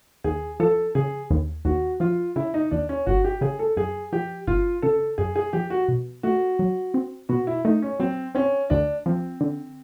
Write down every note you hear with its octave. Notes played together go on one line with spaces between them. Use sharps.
D#2 G#4
F3 A4
C#3 G#4
D#2
D#2 F#4
F3 F4
C#3 E4
D#4
D#2 D4
C#4
G1 F#4
G4
C#3 G#4
A4
F#2 G#4
F3 G4
G1 F4
C#3 A4
F#2 G#4
G#4
F3 G4
F#4
B2
A3 F#4
F#3
C4
B2 F#4
E4
A3 D#4
C#4
F#3 C4
C4 C#4
D2 D4
F3 C4
D3